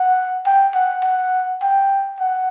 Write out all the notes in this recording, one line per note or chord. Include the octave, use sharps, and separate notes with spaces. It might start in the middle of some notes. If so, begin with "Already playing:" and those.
Already playing: F#5
G5
F#5
F#5
G5
F#5